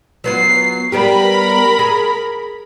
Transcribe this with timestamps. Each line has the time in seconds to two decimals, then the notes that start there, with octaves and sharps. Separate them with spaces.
0.24 F#3 B3 F4 C7
0.92 G3 B3 G4 A#4 B5
1.79 G#4